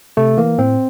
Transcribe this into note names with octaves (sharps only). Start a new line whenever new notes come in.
C3 A3
E3 A#3
A2 C4